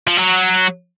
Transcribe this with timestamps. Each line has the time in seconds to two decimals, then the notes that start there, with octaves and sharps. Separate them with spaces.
0.08 F3
0.17 F#3